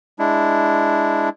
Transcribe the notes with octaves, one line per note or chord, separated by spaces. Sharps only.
G#3 D4 E4